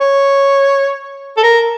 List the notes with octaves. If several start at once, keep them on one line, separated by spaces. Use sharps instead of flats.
C#5
A4
A#4